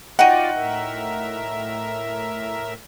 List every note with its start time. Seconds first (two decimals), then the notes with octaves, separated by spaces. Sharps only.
0.19 D#4 F4 F#4 D5 F#5 G5 D#7
0.54 A2 A#4 E5